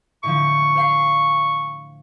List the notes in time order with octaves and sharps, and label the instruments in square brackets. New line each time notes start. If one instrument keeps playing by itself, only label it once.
[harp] A2 D3 F3 [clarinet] C#6
[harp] C5 F5 C7